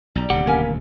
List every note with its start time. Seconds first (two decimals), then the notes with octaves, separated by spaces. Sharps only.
0.15 B1 G3 A#5
0.30 D#1 D2 C3 G4 F#5
0.47 A#3 B3 C#4 G#5